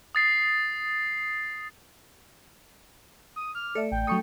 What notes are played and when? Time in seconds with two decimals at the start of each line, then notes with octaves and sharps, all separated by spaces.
0.15 D#6 A6 C7
3.36 D#6
3.55 D6 F6
3.75 A3 A4 D5 E5
3.92 A1 G5
4.07 F#3 A3 D4 A4 C#6 D#6